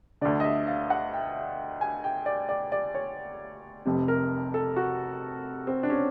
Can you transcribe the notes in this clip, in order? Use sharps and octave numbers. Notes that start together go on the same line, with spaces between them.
D2 D3 D5
D#5
E5
F5
F#5
G5
G#5
G5
D5
D5
D5
C#5
F1 F2 C3
A#4
A4
F#4
C4
D4
C#4